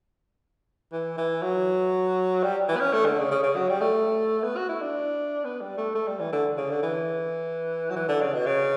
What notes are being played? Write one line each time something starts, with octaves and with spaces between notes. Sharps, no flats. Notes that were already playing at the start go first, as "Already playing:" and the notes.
E3
E3
F#3
G3
E3
B3
C#4
A3
D3
C#3
C#3
C#3
F#3
G3
A3
B3
F#4
E4
D4
B3
G3
A3
A3
G3
E3
D3
C#3
D3
E3
F#3
E3
D3
C#3
B2
C#3